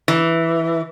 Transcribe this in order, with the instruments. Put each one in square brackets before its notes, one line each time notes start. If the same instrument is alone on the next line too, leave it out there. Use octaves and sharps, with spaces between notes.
[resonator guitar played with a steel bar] E3